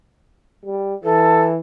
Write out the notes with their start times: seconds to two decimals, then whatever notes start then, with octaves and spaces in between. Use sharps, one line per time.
0.65 G3
1.04 E3 A4